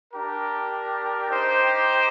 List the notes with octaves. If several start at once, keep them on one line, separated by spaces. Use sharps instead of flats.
D4 G4 A#4
D#4 G4 C5